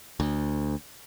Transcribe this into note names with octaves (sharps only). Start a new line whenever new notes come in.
D2